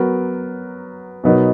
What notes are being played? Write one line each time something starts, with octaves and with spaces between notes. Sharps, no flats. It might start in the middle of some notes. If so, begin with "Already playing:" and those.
Already playing: F#3 B3 F#4 A#4
B2 F#3 B3 D#4 A#4